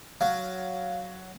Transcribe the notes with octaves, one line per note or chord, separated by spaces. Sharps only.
F#3 F5